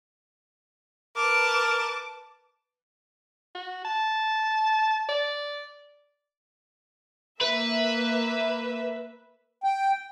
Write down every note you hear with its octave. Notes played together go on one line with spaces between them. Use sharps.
A#4 B4 A5 D6
F#4
A5
D5
A#3 B4 E5
G5